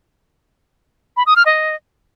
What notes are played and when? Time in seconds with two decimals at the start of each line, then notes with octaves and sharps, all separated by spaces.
1.17 B5
1.26 D#6
1.36 F6
1.46 D#5